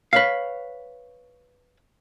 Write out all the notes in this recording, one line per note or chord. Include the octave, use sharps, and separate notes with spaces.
B4 C#5 F5